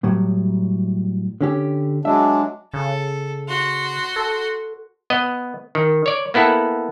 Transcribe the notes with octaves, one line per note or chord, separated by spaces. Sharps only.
A2 F#3 G3
D3 C#4 G4
F#3 G#3 D4 E5
C#3 A4
F#4 C6
A4
B3 D#5
D#3
C#5 D5
A#3 B3 E4 A4 F#5